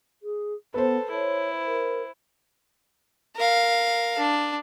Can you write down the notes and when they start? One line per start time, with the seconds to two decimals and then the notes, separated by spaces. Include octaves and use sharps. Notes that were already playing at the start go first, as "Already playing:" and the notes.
0.22 G#4
0.74 B3 A4 B4 C5
1.10 E4 C#5
1.65 A#4
3.36 A#4 F5
4.19 D4